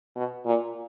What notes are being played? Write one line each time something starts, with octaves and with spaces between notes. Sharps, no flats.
B2
A#2